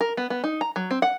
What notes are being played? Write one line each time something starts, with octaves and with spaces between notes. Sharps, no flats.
A#4
B3
B3
D#4
A#5
F#3
C4
F#5